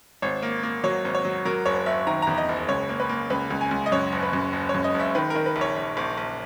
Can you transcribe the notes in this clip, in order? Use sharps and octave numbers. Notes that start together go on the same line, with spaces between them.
G#1 C#5
A#3
A#3
F#3 C#5
G#1
C#5
F#3
F#3 A#4
F#1 C#5
F#1 E5
D#3 A#5
E2 A#5
D#5
F#1
C#2 C#5
A#3
B4
A#3
C#2 B4
C#2
G#5
C#2
D#5
F#2 C#5
F#1
B4
F#2
F#1
C#5
F#2
D#5
F#1
E5
D#3 B4
A#4
D#3
B4
A#1
C#5
A#1
A#1
A#1